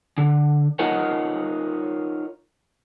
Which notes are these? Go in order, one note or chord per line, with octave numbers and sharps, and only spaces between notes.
D3
D#4 F4 A#4 C#5 D#5 F#5